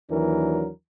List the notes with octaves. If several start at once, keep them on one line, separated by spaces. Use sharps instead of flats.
D#2 E3 F#3 D4 A#4